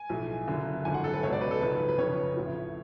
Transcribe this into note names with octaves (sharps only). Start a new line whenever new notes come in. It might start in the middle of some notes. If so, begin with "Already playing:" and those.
Already playing: G#5
B1 A2 F3
F#1 F#2 D3
G#1 F#2 D3 F3 G#5
F#5
A4
B4
C#2 B2 C#5
D5
B4
A4
G#1 F#2 C#3 F3 B4
B4
F1 F2 C#3 F3 C#5
A1 A2 F3